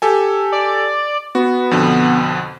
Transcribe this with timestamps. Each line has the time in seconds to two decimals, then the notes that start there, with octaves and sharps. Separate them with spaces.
0.02 G4 A4 G#5
0.52 D5
1.35 B3 F#4
1.71 F2 B2 D3